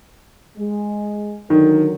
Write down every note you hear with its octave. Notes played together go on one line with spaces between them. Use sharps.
G#3
D3 D#3 F#3 A#4